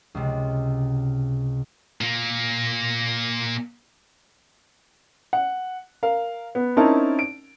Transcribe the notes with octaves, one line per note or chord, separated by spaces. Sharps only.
C#2 C3
A#2 A#3
F#5
A#4 F5
B3
C4 C#4 D#4 E4 A#4 A5
D7